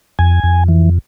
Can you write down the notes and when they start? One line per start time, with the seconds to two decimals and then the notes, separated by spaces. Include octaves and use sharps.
0.19 F2 G#5
0.44 F2
0.68 E3